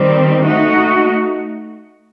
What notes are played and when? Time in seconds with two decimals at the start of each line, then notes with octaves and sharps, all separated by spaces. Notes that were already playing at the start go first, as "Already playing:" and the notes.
Already playing: D#3 G3 C4
0.44 A3 D#4 F#4